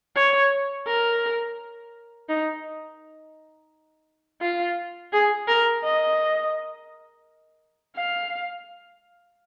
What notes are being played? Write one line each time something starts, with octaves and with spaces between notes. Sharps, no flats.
C#5
A#4
D#4
F4
G#4
A#4
D#5
F5